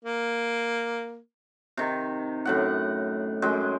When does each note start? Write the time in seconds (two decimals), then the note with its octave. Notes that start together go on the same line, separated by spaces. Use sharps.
0.04 A#3
1.77 C3 D#3
2.45 F#2 A2 F#5
3.42 F#2 G#3 G5